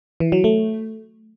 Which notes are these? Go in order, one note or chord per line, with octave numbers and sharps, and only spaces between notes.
E3
F#3
A3